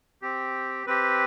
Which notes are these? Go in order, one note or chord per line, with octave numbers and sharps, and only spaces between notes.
C4 G4
C4 G4 B4